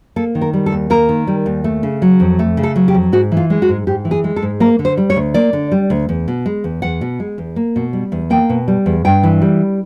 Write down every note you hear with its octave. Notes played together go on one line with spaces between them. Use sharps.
A#3 A4
D#3
A#4
G3
A4
D#2
A#3 A#4
D#3
G3
D#2
A3
C#3
F#3
F2
A3
C#3
A4
F#3
G4
F2
G#2 F#4
E3
F4
G#3
F#4
G#2
G#2 G4
E3
G#4
G#3
A4
G#2
A#3 A#4
D3
C5
G3
C#5
D2
A#3 D5
D3
G3
D2
E2
B2
G#3
E2
E2 F#5
B2
G#3
E2
A#3
B2
G3
E2
A#3 G5
B2
G3
E2
G2 G5
E3
G3